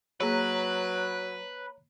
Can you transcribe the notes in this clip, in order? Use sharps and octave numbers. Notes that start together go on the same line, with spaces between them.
F#3 A#3 G#4 B4 C#5 A#5 E6